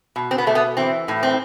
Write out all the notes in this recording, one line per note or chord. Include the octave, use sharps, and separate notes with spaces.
B2
C4
B3
B2 A3
B3
E3 C4
A2
C4